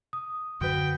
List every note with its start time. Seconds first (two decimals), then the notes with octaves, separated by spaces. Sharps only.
0.13 D#6
0.61 F#2 D3 F#4 B4 G5